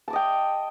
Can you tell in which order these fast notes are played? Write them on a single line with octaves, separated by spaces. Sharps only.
A5 D6 D#5 G5